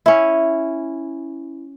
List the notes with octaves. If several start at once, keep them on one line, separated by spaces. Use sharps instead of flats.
C#4 E4